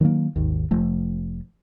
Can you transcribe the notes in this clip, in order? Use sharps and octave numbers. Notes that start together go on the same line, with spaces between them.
D#3 F#3 G3 A#3
G#1 D#2
F1 F3 A3